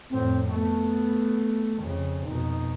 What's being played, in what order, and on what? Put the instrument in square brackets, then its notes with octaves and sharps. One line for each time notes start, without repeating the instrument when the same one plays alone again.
[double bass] F2 A2 [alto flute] C4
[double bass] A3 [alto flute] B3
[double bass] F2 C#3
[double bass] F2 B2 [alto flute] D#4